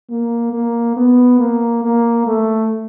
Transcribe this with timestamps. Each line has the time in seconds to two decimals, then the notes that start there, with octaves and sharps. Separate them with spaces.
0.10 A#3
0.53 A#3
0.97 B3
1.39 A#3
1.83 A#3
2.27 A3